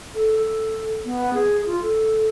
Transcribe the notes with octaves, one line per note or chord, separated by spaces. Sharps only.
A4
A4
B3
G#4
F4
A4